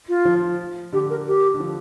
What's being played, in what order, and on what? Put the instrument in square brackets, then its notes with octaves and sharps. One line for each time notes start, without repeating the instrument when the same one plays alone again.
[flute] F4
[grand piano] F3
[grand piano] D3 [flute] G4
[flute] A#4
G4
[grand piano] D3
F3